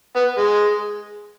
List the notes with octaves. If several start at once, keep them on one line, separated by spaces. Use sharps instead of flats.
B3
G#3